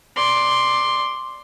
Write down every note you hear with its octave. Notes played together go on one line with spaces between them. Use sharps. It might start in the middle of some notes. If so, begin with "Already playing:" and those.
D5 C6